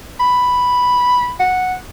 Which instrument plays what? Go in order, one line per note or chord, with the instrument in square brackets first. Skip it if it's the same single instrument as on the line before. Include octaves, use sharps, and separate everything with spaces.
[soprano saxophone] B5
F#5